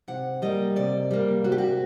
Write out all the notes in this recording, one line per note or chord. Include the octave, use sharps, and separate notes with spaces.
C3 F#5
G3 A#3 D#5
C3 D5
G3 A#3
C3 F#4
G4
F#4